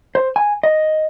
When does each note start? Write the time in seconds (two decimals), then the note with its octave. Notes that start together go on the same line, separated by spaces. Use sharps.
0.15 C5
0.36 G#5
0.63 D#5